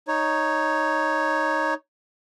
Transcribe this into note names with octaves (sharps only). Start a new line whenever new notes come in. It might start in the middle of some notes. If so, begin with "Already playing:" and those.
D#4 C#5